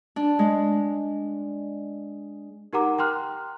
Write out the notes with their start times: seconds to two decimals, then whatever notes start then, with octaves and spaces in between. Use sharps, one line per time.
0.16 D4
0.39 G#3
2.73 D#4 G4 A#4 F#5 A#5 D6
2.98 G5 A#5 C6 F6 F#6